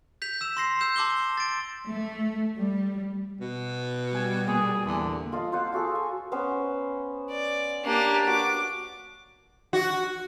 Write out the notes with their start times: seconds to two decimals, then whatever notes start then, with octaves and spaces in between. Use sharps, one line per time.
0.22 G6 B6 F7
0.41 E6 E7
0.57 C6 A#6 C7
0.81 E6 G6 E7
0.96 A5 C6 D6 E6 G7
1.37 A6 D7
1.87 A3
2.59 G3
3.41 B2
4.14 G3 G#5
4.47 A#2 G#4
4.85 E2 D3
5.32 F4 A4 D#5 F5
5.52 F4 C5 F#5 D6
5.72 F4 F#4 G#4 A4
5.95 G#5
6.32 B3 C#4 C5
7.31 D5
7.84 A#3 D4 G4
8.27 F#4 D6
9.73 F#4